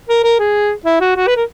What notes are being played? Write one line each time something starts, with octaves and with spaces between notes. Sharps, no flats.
A#4
A#4
G#4
E4
F#4
F#4
B4
A#4